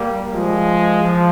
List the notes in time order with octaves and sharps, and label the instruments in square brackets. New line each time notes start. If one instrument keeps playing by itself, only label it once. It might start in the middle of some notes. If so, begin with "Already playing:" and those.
Already playing: [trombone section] G3 A#3
F3 G#3
F3